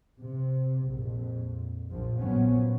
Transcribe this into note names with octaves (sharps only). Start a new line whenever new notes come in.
C3
A#1 F2
A#1 F3
A#2 F3 F#3 B3 C#4